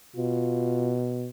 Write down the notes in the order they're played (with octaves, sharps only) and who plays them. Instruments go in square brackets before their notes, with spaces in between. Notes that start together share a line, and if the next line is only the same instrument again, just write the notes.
[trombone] B2 [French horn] F4